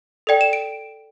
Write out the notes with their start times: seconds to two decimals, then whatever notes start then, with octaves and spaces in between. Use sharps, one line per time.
0.27 A4 D5 G5
0.41 E7
0.53 D7